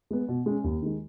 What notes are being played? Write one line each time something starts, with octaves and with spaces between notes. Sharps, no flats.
G#3 B3
B2
G#3 C#4
D#2
D#3 G#3